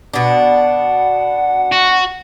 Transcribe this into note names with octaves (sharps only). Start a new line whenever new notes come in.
B2 D4 F#5
F#4